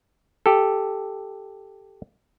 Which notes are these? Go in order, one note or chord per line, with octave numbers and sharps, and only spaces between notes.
G4 A4